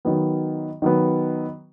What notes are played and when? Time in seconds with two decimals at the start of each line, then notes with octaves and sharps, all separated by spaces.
0.05 D#3 F#3 B3
0.82 D#3 F#3 B3